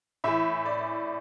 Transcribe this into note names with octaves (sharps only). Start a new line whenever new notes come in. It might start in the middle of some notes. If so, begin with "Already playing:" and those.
A2 E3 E5
D5